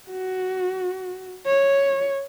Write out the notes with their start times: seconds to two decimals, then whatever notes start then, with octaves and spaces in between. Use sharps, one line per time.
0.10 F#4
1.46 C#5